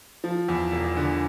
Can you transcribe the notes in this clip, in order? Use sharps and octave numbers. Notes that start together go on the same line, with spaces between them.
F3
E2
E1
D3